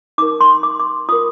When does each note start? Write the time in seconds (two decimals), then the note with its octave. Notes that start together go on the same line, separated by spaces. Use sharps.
0.18 D#4 D6
0.22 A#4
0.41 C6
0.63 D6
0.80 D6
1.09 F4 D#6
1.12 A#4